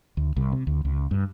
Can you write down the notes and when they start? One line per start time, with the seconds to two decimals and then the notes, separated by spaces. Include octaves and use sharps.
0.17 D2
0.37 C2
0.52 C3
0.67 D2
0.85 C#2
1.11 G2